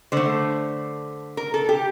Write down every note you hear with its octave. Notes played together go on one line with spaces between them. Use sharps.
D3 A3 C5
A#4
A4
G4